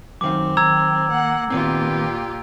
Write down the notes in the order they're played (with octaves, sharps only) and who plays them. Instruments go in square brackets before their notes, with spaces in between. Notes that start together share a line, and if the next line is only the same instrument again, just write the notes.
[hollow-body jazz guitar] F#2 D#3 F5 [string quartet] F#3 C4 [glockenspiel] D6
[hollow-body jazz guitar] D#3 [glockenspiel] A#5 E6 G#6
[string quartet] A#3 F#5
[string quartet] A#2 F4 G4 [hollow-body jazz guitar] D#3 B3 C4